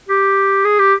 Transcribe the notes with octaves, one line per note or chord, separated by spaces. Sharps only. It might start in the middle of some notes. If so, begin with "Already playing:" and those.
G4
G#4
G4